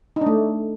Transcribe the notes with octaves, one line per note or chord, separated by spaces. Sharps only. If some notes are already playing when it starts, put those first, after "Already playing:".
D#4
D4
A3